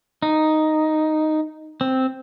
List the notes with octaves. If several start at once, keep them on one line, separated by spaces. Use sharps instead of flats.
D#4
C4